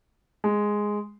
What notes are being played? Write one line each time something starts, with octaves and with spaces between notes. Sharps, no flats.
G#3